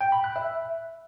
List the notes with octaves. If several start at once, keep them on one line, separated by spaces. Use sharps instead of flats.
G5
B5
F#6
E5